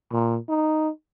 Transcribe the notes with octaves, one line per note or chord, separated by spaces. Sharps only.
A#2
D#4